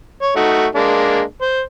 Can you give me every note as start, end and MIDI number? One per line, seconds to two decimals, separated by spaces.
0.22 0.31 73
0.36 0.66 57
0.36 0.66 63
0.36 0.66 66
0.75 1.22 56
0.75 1.22 58
0.75 1.22 62
1.41 1.61 72